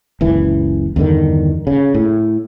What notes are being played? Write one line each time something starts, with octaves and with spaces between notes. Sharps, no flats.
F#1 C#2 E3
E2 G2 D3 D#3
C#3
A2